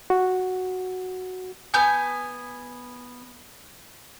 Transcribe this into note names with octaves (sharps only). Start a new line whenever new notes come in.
F#4
B3 G#5 G6